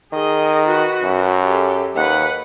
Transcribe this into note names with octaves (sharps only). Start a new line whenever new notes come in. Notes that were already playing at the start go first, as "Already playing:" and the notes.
D#3 G#4 D#5
F#4 B4
F#2
G4 A4
D#2 B4 F#5